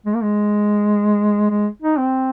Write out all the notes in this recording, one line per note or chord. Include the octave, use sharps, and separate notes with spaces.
G#3
A#3
G#3
G#3
D#4
C4